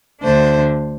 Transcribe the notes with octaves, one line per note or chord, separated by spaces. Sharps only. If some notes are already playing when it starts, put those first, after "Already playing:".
D2 D3 A3 D4 C5